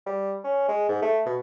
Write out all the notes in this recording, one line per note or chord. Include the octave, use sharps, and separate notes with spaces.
G3
C#4
G#3
G#2
A3
B2